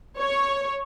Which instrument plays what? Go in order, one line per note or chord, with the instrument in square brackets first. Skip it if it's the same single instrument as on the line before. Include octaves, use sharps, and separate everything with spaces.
[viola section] C#5